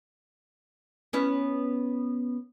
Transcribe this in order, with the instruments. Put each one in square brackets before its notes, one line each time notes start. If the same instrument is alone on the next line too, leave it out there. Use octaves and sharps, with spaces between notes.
[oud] B3 C#4 E4